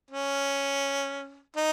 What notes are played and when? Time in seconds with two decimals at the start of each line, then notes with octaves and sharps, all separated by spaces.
0.11 C#4
1.56 D#4